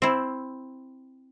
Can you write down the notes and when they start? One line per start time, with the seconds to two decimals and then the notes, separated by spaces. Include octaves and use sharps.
0.02 C4 E4